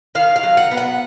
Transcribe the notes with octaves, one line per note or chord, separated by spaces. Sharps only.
D#3 F5
F5
F#3
F#5
B3
F#5